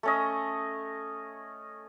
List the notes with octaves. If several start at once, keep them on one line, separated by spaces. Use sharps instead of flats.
A3 C#4 D#5